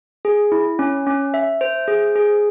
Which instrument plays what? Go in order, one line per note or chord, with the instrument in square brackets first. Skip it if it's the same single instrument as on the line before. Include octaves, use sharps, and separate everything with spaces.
[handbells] G#4
E4
C#4
C#4
E5
C5
G#4
G#4